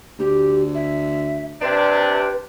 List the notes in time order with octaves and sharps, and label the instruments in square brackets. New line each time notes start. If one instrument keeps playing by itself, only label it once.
[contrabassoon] D2 [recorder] G4
[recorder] E5
[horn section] C3 D4 [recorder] B4